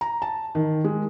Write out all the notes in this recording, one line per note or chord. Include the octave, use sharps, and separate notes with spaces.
A#5
A5
D#3
G#3